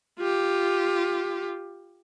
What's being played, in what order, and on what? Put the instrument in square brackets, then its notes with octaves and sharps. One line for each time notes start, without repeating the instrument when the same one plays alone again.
[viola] F4 G4